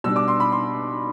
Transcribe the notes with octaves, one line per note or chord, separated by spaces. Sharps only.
B2 G3 D4 E6
D6
C6
B5
C6